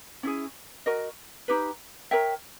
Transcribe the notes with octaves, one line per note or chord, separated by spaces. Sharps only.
C#4 E4 G#4
F#4 A#4 D#5
D#4 G4 B4
A#4 C#5 E5 G5